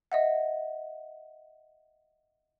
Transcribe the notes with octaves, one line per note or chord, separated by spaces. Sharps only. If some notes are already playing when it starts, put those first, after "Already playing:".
D#5 E5 F#5